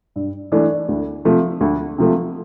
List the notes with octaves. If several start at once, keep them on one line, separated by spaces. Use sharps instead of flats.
G2
E3 A3 D4
D2
C3 F3 A3
D2
C3 F3 A3